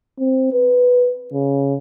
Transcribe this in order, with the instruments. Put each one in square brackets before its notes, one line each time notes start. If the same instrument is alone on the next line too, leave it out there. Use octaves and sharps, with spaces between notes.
[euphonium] C4
B4
C#3